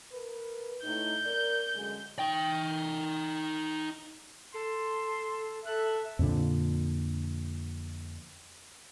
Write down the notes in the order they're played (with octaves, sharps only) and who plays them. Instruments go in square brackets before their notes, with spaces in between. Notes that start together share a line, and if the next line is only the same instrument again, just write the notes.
[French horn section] A#4 B4
[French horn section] A2 D#4 [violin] G6
[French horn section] A#4 D5
F#2 D3 G#3
[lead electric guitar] D#4 G5
[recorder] A4 [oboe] C6
[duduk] A4 [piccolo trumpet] E5 [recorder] F#6
[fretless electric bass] F2 A#2 D3 D4